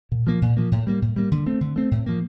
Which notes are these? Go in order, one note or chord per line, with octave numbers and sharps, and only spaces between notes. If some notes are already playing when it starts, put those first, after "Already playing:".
A#2
F3 A#3
A#2
F3 A#3
A2
G3 A#3
A2
G3 A#3
D3
A3 C4
D3
A3 C4
A2
F3 A#3